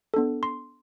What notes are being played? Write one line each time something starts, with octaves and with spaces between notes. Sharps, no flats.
B3 D4 A4
C6